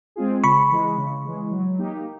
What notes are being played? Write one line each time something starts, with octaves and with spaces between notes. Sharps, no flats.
G#3 C4 F4 G#4
C#3 B5 C#6
E3 G#3
C#3
E3 G#3
F#3
A#3 D#4 G4